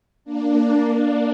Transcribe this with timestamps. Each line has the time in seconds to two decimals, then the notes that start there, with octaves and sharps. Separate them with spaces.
0.24 A#3 D4
0.94 A#3 D4